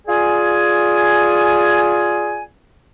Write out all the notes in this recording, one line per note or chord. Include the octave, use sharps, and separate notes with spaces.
F4 G#4 D5 G#5